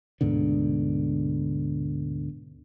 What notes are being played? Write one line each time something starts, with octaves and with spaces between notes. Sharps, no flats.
D2 G#2 B2 D3